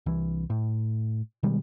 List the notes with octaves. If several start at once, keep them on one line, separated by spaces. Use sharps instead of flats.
C2 E3
A2
B2 D#3 G3 G#3